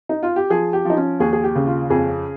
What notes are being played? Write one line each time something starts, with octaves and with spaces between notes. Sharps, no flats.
D#4
F4
G4
F3 G#4
G4
F3 D#4
C#4
D#2 G#4
G#4
G4
C#3
F4
F2 G#4